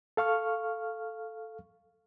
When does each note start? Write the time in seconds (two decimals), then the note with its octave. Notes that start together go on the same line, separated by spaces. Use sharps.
0.17 A4 F5 C#6 F6